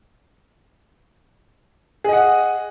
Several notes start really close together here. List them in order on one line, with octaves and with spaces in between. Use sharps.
G#4 D#5 F#5